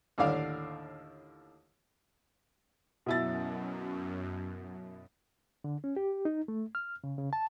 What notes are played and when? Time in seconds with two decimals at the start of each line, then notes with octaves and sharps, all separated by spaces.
0.18 D#2 A2 D3 D5 F5
3.06 F#2 B2 E4 A6
5.64 D3
5.84 C#4
5.96 G4
6.25 D#4
6.48 A3
6.75 F6
7.04 C#3
7.18 C#3
7.33 A5